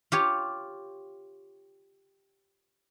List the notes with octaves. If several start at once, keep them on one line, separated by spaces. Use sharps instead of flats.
F4 G4 C#5